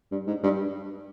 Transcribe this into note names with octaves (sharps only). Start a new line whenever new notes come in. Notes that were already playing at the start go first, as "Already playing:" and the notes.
G2
G#2
G2